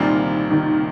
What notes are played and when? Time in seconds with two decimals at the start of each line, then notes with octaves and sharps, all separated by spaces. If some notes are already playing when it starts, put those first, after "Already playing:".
Already playing: C2 A#2 D#3 G3 C4 F4
0.51 D#3